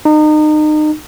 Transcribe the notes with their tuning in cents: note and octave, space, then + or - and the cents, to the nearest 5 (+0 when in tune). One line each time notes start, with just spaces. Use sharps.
D#4 -30